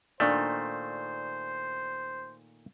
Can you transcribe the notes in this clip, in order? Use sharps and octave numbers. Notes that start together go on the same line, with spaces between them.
A#2 D#3 A3 D4 C5 D5